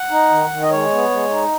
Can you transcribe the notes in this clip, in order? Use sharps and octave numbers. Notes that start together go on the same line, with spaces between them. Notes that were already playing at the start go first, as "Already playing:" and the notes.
Already playing: F#5
D#4
D#3
D#3
D#5
G#3 C#5
B3
G#3
D#4